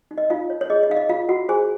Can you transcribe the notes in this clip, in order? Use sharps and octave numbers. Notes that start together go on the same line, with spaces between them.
D#4
D#5
D#4 F4 F5
C#5
C#5
G#4 D#5
D#5
D#4 F5
D#5
F4 F5
F4 F#4 F#5
G#4 C5 G#5